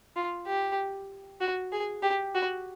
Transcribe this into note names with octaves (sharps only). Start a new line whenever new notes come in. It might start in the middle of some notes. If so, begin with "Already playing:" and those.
F4
G4
F#4
G#4
G4
F#4